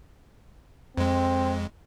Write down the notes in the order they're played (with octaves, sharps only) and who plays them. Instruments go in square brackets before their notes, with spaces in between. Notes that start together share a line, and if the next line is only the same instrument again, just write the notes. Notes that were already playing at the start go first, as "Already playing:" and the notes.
[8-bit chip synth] F2 G#3 [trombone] C4